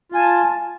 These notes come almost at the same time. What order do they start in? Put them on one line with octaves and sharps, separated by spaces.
F4 G#5 A5